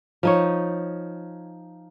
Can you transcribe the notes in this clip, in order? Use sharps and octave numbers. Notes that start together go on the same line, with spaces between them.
F3 D#4 C#5